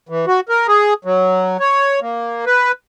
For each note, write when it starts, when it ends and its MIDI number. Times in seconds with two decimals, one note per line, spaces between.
0.09 0.25 52
0.27 0.40 66
0.49 0.67 70
0.68 0.94 68
1.05 1.57 54
1.60 2.00 73
2.01 2.45 58
2.46 2.72 71